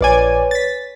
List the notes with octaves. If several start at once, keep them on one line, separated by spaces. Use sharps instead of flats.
A#1 B4 C#5 D5 G#5
A6 B6